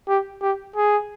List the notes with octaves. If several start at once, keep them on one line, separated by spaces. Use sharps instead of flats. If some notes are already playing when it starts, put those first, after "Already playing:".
G4
G4
G#4